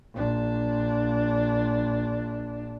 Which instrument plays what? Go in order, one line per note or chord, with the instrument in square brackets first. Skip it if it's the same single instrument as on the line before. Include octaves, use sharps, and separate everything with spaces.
[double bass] A#1 D4